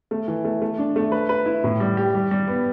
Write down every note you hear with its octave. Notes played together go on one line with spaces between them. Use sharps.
A3
E3
A3
A3
D4
A3
B4
B4
E4
A2
G3
G4
G3
G3
B3